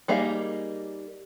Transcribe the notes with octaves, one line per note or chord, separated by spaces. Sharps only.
G3 A#3 D#4 G#4 F5